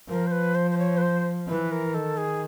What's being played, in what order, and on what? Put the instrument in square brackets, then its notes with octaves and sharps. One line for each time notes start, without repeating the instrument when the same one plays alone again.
[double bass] F3 [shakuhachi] A#4
[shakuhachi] C5
B4
C5
C5
C#5
B4
C5
[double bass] E3 [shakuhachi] B4
[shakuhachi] A#4
[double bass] D#3 [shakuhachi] A4
[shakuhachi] G#4